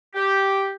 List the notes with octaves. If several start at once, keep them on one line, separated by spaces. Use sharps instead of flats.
G4